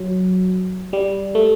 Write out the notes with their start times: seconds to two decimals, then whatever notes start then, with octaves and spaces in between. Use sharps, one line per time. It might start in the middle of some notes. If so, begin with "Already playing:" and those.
Already playing: F#3
0.93 G3
1.35 A3